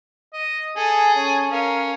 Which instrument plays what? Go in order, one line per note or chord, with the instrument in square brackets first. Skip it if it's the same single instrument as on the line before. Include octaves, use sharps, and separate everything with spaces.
[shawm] D#5
[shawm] G#4 [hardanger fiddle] A4 [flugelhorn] G#5
[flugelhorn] C#4
[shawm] C#4 [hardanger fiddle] A#4 [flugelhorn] F5